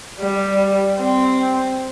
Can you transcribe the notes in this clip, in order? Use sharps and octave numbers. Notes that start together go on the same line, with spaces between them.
G3
C4